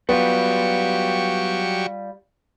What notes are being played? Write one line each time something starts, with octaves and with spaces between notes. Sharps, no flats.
F#3 G3 B3 F4 G4 C#6